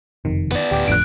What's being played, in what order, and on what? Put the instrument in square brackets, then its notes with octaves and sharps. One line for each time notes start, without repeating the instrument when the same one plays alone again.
[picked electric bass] F#1 F2 C3 [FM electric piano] D#3
[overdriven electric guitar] B3 D5
[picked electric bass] D1 D2 [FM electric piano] G4 G5 D6
[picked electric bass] G#1 F2 A2 [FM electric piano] D3 F3 [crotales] F#6 D7